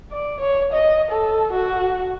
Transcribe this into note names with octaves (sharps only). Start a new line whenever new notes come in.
D5
C#5
D#5
A4
F#4